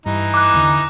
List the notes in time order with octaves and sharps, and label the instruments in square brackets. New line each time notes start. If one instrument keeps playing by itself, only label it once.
[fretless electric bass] G2 [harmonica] E3 D#4
[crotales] D6 F#6
[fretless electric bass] E2 D3